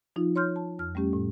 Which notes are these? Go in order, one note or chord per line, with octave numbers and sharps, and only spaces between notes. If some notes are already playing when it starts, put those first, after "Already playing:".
F3 D#4 F4
C#5 C6 F6 G6
A5
F2 F6
G3 A3 C#4 G4
A2